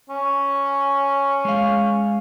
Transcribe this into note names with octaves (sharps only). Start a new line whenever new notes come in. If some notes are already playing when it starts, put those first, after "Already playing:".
C#4
G#3 F5